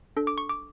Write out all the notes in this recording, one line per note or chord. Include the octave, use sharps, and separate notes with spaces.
D4 A4
D6
C#6
D6